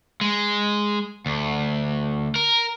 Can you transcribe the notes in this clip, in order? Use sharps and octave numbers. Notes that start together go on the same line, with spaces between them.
G#3
D2
A#4